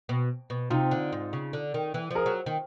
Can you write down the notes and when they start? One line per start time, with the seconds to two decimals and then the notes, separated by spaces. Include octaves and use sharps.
0.09 B2
0.50 B2
0.70 C3 D#4 F4
0.91 D3
1.12 G#2
1.33 C#3
1.53 D3
1.74 D#3
1.94 E3
2.11 F3 G#4 A#4
2.26 F#3
2.46 D#3